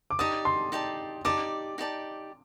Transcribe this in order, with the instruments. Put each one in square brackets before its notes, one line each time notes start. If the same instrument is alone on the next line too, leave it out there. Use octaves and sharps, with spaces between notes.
[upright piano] D6
[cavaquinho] D#4 G4 D5 A5 [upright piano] D#6
[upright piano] C6
[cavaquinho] D#4 G4 D5 A5
[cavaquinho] D#4 G4 D5 A5 [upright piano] D6
[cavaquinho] D#4 G4 D5 A5